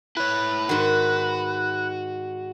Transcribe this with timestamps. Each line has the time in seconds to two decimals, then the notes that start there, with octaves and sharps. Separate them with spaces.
0.17 E4 B4 C#5
0.69 G#2 D#3 F#4